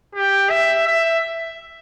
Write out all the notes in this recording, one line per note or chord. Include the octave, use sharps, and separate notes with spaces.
G4
E5
E5